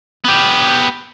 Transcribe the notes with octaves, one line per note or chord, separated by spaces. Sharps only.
B3 G4